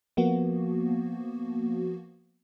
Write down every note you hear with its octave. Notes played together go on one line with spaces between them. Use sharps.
F3 A#3 B3 F#4